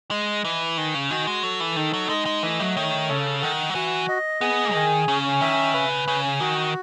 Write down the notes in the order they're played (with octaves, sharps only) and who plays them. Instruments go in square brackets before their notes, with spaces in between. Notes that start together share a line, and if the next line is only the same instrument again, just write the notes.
[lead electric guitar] G#3 [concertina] D#5
[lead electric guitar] E3 [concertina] B4
[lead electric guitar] D#3 [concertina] G#5
[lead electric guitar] C#3
[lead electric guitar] D#3 [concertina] F#4
[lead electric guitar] G#3
[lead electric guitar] F#3 [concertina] A4
[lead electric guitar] E3
[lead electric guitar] D#3 [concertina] D#4
[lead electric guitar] F#3
[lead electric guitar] G#3 [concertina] D#5
[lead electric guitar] G#3
[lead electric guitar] E3 [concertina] A3
[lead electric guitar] F#3
[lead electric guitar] D#3 [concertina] C#5
[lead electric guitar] C#3 [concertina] A4
[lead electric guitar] D#3 [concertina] F#5
[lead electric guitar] F#3
[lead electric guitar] E3 [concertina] F#4
[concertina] D#5
[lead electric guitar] B3 [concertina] G#4
[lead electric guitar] D#3 [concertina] G#5
[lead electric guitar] C#3 [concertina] C#4
[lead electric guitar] D#3 [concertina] E5
[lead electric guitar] C#3 [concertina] B4
[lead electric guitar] C#3 [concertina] G#5
[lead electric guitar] D#3 [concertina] F#4